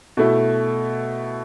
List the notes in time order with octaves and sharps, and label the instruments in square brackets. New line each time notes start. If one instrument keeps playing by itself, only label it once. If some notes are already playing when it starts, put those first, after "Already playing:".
[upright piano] B2 A3 E4